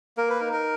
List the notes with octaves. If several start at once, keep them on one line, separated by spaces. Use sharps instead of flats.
A#3 A#4
B4
D#4 A#4
A#4